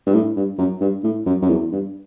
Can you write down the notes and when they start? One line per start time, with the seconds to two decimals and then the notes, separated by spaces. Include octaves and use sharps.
0.07 G2
0.14 A2
0.36 G2
0.58 F#2
0.81 G2
1.04 A2
1.26 F#2
1.42 F#2
1.49 E2
1.72 G2